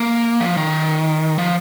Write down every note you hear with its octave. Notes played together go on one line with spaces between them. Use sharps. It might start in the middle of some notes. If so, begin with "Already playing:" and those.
Already playing: A#3
F3
D#3
F3